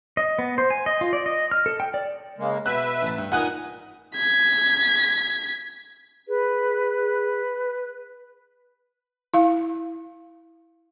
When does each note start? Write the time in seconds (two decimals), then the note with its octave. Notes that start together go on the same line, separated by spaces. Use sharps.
0.17 D#5
0.39 B3
0.58 C5
0.70 G#5
0.86 D#5
1.01 F4
1.13 D5
1.26 D#5
1.51 F6
1.66 A4
1.80 G5
1.94 D5
2.38 C#3 G#3 A#3
2.66 B2 B4 E5 F#6
3.03 A1 A5
3.18 G2
3.32 A#2 D#4 A#4 F#5 G#5 D#6 F#6
4.16 G#6 B6
6.28 G#4 B4
9.34 E4 F5